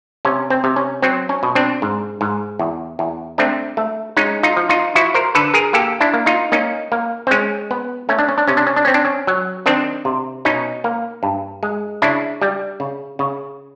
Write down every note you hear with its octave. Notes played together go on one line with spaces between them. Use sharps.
C3 C#4
C4
C3
C#4
F#3 C4
C#4
B2
C4 D4
G#2
G#2
E2
E2
A3 C4 D4
A3
G#3 C#4 D#4
D#4 F4
F3
D#4 F4
F3 E4 F#4
A#4 C5
D3 A4 B4
G#4 A#4
A#3 G4 A4
D4 E4
A#3
D#4 F4
A#3 C#4 D#4
A#3
C4
G#3 C#4
B3
A3 C#4
D4
C#4
D4
C3 C#4
D4
C#4
D4
C4 C#4
D4
C#4
F#3
D#3 C4 D4
C3
B2 C#4 D#4
A#3
G2
G#3
C#3 D4 E4
G3
C#3
C#3